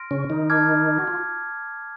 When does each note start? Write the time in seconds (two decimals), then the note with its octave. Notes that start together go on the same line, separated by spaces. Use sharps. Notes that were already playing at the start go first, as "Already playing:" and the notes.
Already playing: C6 F6 A#6 D7
0.11 C#3 C#4
0.30 D#3 D#4
0.50 A5 D6 F6 G#6
0.98 F#4
1.07 F4